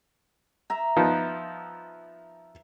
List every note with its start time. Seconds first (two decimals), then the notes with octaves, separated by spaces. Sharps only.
0.70 E5 A#5
0.97 F3 B3 D#4